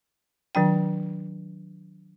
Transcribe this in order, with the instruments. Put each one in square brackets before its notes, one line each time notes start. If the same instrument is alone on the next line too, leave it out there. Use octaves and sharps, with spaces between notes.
[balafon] D#3 F#3 D4 G5